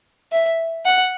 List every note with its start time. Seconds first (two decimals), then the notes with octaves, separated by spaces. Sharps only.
0.32 E5
0.85 F#5